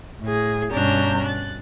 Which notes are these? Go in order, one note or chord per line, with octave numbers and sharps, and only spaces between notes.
A2 G#4
G2 B2 C#4 D4 A#5 G6
F#6 A6